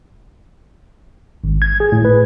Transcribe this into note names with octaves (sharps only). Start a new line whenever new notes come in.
G#1
G#6
G#4
A2
B4